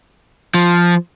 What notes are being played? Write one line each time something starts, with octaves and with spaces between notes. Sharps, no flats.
F3